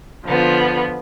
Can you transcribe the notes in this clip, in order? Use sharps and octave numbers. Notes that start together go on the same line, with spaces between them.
D3 F3 B3 F4